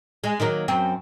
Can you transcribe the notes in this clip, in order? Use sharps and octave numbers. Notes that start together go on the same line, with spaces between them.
G#3
D#3 F#3 A#3
F#2 C4